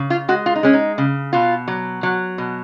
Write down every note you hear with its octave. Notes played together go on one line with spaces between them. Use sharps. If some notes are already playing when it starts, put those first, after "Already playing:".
Already playing: C#3
F4
G#3 F#4
F4
D#4
G#3 C#4
D#4
C#3
B2 F4
F#3
F#3
B2